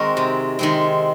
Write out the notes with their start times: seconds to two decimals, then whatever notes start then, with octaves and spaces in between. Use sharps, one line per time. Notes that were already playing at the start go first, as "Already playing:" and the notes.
Already playing: D#3 G#3 C4 F#4 A#4
0.17 C3
0.59 D#3 G#3 C4